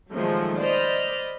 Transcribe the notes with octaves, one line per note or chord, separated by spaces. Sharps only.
A#2 D#3 F3 F#3 G#3 A3
C5 D5 D#5 B5 F6